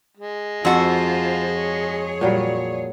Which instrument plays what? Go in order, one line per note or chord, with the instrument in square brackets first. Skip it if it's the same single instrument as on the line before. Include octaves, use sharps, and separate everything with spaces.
[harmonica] G#3
[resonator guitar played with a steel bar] F2 F#4 [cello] F4 C5
[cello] G#4 C#5
[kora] A#2 F#3 G3